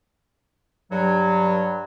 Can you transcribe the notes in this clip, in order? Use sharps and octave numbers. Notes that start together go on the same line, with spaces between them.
G2 F#3